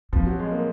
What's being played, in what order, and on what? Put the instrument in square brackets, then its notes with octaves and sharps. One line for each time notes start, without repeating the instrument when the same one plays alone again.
[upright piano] F3 [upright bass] C4
[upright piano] F#3
G#3
A#3